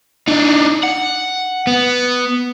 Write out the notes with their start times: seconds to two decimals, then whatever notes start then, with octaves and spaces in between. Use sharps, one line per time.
0.28 D4 D#4
0.83 F#5
1.67 B3